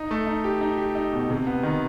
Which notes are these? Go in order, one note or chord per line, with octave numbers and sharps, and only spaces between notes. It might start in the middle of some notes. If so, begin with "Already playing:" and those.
Already playing: D#4
A3
D#4
G4
D#4
G4
D#4
B2
C3
B3
D#3